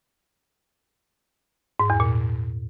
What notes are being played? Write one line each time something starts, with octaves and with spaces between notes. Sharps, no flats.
G#2
E2
A#2